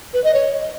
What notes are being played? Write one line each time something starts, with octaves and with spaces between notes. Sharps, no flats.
B4
D#5
C#5